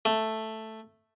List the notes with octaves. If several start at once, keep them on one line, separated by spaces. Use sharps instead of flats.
A3